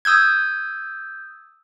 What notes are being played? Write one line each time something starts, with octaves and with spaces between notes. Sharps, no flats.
D#6 E6 G6 G#6